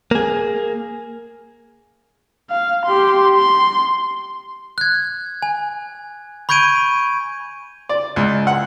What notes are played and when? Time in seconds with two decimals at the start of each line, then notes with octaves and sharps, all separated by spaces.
0.11 A#3 G#4
2.51 F5
2.86 G4 C6
3.35 C6
4.78 F#6 G#6
5.42 G#5
6.49 B5 C#6 G6 G#6 D7 D#7
7.89 D5
8.16 C#2
8.47 F#5